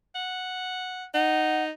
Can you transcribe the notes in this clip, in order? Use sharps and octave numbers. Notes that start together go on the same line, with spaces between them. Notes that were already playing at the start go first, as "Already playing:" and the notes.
F#5
D#4 F#5